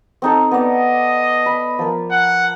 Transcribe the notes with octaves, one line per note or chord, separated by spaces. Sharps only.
C4 D#4 A4
B3 D5 D#5
B5
F3 A#4
F#5